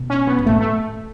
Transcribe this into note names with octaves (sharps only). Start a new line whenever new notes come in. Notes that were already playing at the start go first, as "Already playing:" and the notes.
Already playing: B2
C#4
B3
G#2
A2 A3
A3